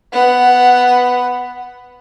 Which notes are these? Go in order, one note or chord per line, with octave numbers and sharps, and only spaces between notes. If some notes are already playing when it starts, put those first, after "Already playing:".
B3 F#5